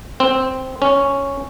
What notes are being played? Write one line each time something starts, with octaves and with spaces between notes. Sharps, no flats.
C4
C#4